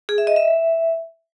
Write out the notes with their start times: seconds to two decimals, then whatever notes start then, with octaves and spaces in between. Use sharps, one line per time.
0.09 G#4
0.18 E5
0.27 D#5
0.36 E5